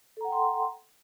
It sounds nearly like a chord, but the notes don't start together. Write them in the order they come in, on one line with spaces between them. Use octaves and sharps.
A4 A#5 F#5 G5 C6